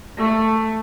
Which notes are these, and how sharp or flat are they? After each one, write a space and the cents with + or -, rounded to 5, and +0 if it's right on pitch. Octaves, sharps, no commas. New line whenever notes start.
A3 +10